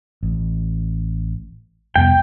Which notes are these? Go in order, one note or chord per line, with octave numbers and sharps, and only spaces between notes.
A1
C2 F2 B3 G5